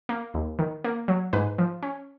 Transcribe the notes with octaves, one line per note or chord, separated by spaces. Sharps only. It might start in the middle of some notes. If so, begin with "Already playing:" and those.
A#3
D#2
D#3
A#3
F#3
G#2 B4
F3
C#4